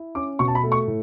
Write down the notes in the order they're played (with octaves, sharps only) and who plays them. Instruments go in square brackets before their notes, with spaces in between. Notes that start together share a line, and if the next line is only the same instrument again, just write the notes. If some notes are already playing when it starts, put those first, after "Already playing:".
Already playing: [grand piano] E4
C#4 D6
B2 C#6
A5
B5
A3
C#6
A2